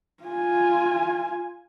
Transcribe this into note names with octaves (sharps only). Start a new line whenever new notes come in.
F4 G#5